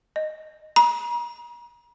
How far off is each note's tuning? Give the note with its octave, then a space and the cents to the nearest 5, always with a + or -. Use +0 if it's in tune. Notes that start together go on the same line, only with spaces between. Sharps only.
D#5 -10
A#5 +45